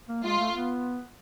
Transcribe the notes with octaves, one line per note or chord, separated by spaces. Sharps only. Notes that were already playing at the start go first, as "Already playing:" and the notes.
A#3
G#3 F4
A3
B3